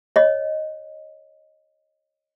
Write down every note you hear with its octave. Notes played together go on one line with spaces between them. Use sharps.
C#5 D#5